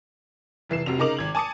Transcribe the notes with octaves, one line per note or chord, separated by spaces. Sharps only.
F1 E3 C7 E7
F1 C3 F#4 F7
C#3 D#4 A#4 D6 F7 F#7
G#1 G#6 F#7
G#5 A5 D6 D#6 C#7